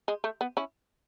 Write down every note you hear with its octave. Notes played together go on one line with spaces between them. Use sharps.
G#3
A3
B3
C#4 E4